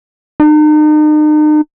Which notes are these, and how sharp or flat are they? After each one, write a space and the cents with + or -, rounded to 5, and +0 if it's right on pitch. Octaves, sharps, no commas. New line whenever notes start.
D#4 -40